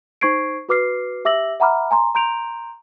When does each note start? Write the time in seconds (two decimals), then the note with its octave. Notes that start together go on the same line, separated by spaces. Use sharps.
0.21 D#4 C5 C#6 G#6 C7 D7
0.69 F#4 B4 D6 F6 C7
1.25 G4 E5 D6 E6 A#6 F#7
1.60 E5 F#5 A#5 B5 D6 F6
1.91 G#5 A#5 C6
2.15 A#5 C6 G6 D7 F7